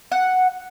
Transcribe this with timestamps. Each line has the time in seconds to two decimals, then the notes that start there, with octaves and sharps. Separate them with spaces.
0.12 F#5